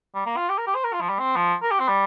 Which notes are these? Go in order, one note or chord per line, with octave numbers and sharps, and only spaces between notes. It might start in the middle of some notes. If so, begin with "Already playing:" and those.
G3
A#3
F4
G4
A#4
G4
C5
A#4
F4
F3
G3
C4
F3
A#4
G4
C4
G3